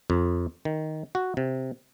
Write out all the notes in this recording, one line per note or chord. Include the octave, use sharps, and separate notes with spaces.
F2
D#3
F#4
C3